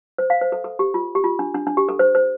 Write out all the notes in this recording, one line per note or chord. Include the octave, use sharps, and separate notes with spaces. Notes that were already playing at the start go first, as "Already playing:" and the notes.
C5
F5
C5
A4
A4
G4
F4
G4
F4
D4
D4
D4
G4
A4
C5
C5